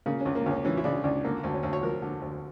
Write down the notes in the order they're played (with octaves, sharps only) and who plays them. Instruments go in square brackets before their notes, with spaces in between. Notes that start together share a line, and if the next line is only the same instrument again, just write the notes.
[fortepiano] C#3 A#3
C#2 C#4
A#3
C#2 C#4
E3 C#4
E4
C#3 D4
C#2 D4
D3 A#3
D2
C#4
D2
C#5
F3 A#4
D3
D2